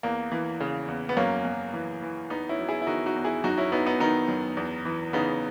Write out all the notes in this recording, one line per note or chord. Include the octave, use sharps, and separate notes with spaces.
E2 A#3
E3
C#3
E2
B3
F#2 A#3 C#4
F#2
E3
E3
E2 B3 D#4
C#4 E4
F#3
E4 G#4
E4
D#3 D#4 F#4
D#4 F#4
E2
E4 G#4
F#2 D#4 F#4
C#4 E4
F#3 B3 D#4
B3 D#4
D#3 B3 D#4
F#2
E2
E3
C#3 B3 D#4